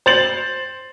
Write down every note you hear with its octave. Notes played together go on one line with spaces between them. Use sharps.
C5 A6 F#7